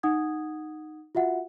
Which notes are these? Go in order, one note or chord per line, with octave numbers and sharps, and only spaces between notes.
D#4 F#5 D#6 G#6
F4 F#4 E5 F#5